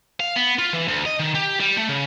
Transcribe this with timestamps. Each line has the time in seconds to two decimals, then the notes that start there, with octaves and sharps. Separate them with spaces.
0.20 F5
0.36 B3
0.59 F4
0.73 E3
0.88 D2
1.06 D#5
1.20 D#3
1.35 G4
1.60 G3
1.77 A3
1.89 C#3